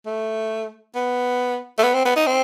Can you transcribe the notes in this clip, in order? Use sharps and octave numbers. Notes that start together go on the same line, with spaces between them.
A3
B3
A3
B3
C4
B3
D#4
C4